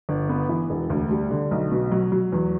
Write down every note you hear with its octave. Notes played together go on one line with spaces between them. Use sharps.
G1
B3
E3
E1
D2
G3
D3
B1
B2
F#3
F#3
E2